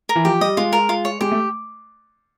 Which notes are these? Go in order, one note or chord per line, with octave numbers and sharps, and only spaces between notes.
A#4
E3
F3 G4
G3 D#5
G#3 F4
A#4
F4
C#5
G#3 G4
A3